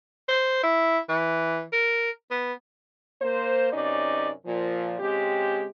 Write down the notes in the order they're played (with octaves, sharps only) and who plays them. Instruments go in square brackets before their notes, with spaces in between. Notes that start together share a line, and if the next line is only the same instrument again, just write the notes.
[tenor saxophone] C5
E4
E3
A#4
B3
[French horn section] A#3 C5
F#2 C3 C#4 D#4 D5
A#2 F3
C#3 G#3 C4 G4